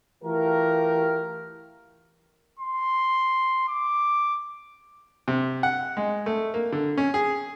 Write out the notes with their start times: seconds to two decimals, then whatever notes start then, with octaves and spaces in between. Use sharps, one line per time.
0.24 E3 A3 F4 G4 A#4
2.60 C6
3.69 D6
5.28 C3
5.63 F#5
5.97 G#3
6.26 A3
6.54 A#3
6.72 D3
6.97 C#4
7.14 G#4